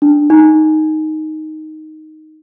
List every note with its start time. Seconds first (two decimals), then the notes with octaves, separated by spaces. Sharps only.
0.02 D4
0.30 D#4